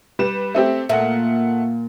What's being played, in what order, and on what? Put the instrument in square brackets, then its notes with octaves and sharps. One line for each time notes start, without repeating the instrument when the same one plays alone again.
[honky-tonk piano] G3 B4 E7
A3 C4 G4
[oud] A#2 A#3 [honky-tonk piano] A3 F#5